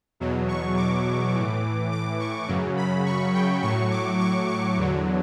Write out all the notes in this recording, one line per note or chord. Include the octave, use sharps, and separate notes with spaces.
E2 B2 F#3
C#6
D6
A2 E3
D6
C#6
F#2 C#3 F#3
B5
C#6
G5
A2 F#3 C#6
D6
C#6
C#6
E2 D3 F#3